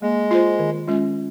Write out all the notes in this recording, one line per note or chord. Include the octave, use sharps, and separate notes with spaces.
G#3 A#3
F4 C5
D#3
G#3 C#4 F4